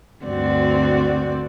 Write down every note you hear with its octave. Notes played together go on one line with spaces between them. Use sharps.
D2 G2 C4 F#4 D5